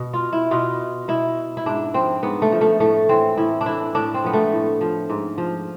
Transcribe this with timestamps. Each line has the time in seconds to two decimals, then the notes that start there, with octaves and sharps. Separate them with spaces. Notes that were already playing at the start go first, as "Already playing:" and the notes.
Already playing: B2
0.13 F4
0.33 E4
0.51 B2 F4
1.08 B2 E4
1.57 E4
1.66 G#2 D4
1.94 F3 C4
2.23 G#2 B3
2.42 A3
2.52 F3
2.61 A3
2.80 A2 A3
3.09 E3 C4
3.37 A2 E4
3.61 D4
3.66 E3 E4
3.95 A2 D4
4.14 C4
4.24 F3 B3
4.33 A3
4.52 A2
4.81 F3
5.10 G#2
5.38 F3